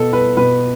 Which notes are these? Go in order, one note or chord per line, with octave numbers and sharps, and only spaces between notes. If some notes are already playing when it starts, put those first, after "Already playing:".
Already playing: B2 A4
B4
B2 B4